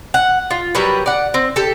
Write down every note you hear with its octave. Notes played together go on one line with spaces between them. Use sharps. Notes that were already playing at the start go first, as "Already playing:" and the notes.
F#5
F4
F#3 G3 A#4 B4
D5 F#5
C4
G4 A4